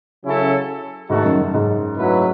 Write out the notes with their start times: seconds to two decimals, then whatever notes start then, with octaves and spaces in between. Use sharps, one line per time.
0.24 C#3 F#3 C#4 E4 A4
1.10 G#2 D#3 A3 D#4 F#4 A4
1.25 F#2
1.39 F#2
1.54 G#2
1.97 F#3 A3 E4 B4